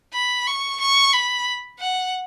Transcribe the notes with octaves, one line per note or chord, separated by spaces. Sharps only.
B5
C#6
C#6
B5
F#5